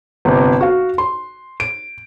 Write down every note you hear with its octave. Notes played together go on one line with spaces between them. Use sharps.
G1 C3
F#4 F5
C6
D7